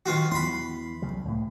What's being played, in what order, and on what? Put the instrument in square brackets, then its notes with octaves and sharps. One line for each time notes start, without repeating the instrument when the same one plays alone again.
[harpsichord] D#3 F4 F#4
[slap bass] E2 E3 [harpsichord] B5 C6
[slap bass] C2 C#3 F#3
C#2 A2